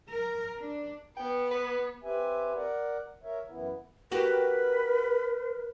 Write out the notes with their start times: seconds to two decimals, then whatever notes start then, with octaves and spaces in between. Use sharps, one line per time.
0.10 A#4
0.59 D4
1.17 B3 G5
1.51 B4
2.03 C4 G4 B4 E5 G#5
2.55 A#4 D5 F#5
3.23 A#4 C#5 E5
3.48 F#2 E3 B3 E4
4.12 F#4 G4 A#4 B4